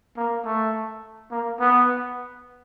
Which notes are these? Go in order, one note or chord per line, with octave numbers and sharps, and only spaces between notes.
A#3
A3
A#3
B3